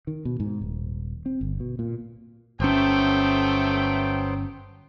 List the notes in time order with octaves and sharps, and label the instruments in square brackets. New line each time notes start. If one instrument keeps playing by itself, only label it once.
[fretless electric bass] D#3
B2
G#2
D#1
C4
G1
B2
A#2
[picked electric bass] G1 C#4 [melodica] F#3 B3 C5 [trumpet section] A3 G5